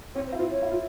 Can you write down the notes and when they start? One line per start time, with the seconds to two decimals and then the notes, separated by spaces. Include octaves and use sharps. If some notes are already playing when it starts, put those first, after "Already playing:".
0.15 C4 C#5
0.27 C5
0.32 E4
0.38 F4 C5
0.51 C#5
0.62 E4
0.72 F4